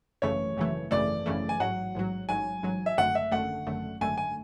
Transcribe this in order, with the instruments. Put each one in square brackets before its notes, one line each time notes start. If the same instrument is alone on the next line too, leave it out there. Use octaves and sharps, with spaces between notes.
[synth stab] G#1 F#2 C#3 E3 A3 [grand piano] C#5
[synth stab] G#1 F#2 C#3 E3 A3
[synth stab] G#1 F#2 C#3 E3 A3 [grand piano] D5
[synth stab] G#1 F#2 C#3 E3 A3
[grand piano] G#5
[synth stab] A1 G#2 F#3 [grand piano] F#5
[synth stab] A1 G#2 F#3
[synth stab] A1 G#2 F#3 [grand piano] G#5
[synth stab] A1 G#2 F#3
[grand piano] E5
[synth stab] G#1 F#2 D3 A3 [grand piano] F#5
[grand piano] E5
[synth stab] G#1 F#2 D3 A3 [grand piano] F#5
[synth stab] G#1 F#2 D3 A3
[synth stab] G#1 F#2 D3 A3 [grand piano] G#5
[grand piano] G#5